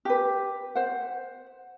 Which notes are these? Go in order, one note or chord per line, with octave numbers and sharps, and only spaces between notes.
G4 B4
C5 F#5